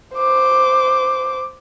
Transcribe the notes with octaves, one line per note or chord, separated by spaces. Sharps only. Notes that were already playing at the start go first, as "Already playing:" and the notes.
C5 D6